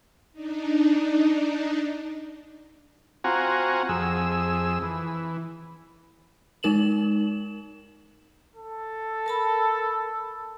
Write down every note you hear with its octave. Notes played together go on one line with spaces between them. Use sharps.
D4 D#4
C4 F4 F#4 F#5 G#5 A#5
F2 G#4 E6
E3
G#3 D#4 A#4 E7 F#7
A4
A#4 A5 B5